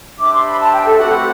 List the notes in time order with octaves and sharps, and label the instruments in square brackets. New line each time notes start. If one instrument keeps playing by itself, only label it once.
[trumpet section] D4 G4 C5 E5 [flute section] D6
[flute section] C6
B5
A5
G5
A4
[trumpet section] A3 C4 G4 B4 F#5 [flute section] F#4
[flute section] F#4